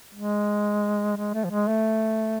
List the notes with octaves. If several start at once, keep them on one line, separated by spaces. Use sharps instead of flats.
G#3
G#3
A3
F3
G#3
A3